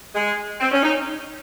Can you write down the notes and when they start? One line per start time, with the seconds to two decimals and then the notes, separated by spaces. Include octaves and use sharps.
0.15 G#3
0.60 C4
0.72 C#4
0.83 D#4